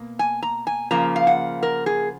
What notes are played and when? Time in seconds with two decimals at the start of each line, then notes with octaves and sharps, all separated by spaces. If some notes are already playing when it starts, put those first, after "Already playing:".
Already playing: B2 A#3
0.19 G#5
0.42 A#5
0.67 G#5
0.91 C#3 F3 A#3 A#5
1.16 F5
1.27 F#5
1.63 A#4
1.86 G#4